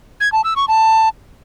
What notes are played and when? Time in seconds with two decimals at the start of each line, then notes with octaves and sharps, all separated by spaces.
0.20 G#6
0.32 A5
0.44 E6
0.56 C#6
0.68 A5